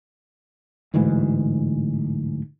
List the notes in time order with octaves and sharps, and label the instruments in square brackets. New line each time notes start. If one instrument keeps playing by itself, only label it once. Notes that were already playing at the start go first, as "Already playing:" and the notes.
[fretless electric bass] D1 D2 G#2 E3